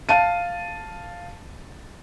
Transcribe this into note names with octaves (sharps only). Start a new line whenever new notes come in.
F5 A5 D#7